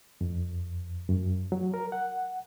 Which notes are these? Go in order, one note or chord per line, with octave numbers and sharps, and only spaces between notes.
F2
F#2
F#3
A#4
F#5